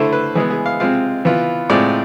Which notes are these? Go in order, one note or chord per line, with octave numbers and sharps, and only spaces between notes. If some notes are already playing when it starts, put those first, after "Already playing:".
Already playing: D3 A3 E4 C5
B4
E3 G#3 B3 G#4
G#4
F5
C3 G#3 C4 F4 F5
E3 B3 F4
A2 G#3 C4 F4 D5